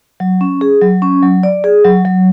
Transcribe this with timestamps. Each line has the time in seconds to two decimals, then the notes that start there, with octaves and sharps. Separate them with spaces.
0.20 F#3
0.41 C#4
0.61 G#4
0.82 F#3
1.02 C#4
1.23 F#3
1.43 D5
1.64 G#4
1.85 F#3
2.05 F#3